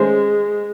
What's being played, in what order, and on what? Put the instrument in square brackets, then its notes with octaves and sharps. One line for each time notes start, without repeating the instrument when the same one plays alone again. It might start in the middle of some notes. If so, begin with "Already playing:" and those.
Already playing: [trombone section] D#3 A3 C#4 G#4 C5 [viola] G#3